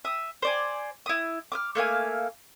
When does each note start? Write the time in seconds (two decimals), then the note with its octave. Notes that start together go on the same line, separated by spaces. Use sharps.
0.05 E5 D#6
0.42 C5 D5 G#5
1.06 E4 D#6
1.52 D6 D#6 F6
1.75 A3 A#3 F5 G#5